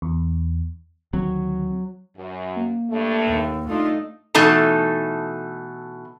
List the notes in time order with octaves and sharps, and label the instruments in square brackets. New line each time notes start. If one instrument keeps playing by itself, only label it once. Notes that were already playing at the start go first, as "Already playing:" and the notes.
[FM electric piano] E2
[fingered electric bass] D2 D#3 C4 [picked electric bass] F#3
[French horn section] F#2
[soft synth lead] A#3
[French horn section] G2 A3
[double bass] D#2
[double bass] A3 D#4 [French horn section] D4 F4
[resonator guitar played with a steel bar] B2 E3 A3 D#4 A4 A5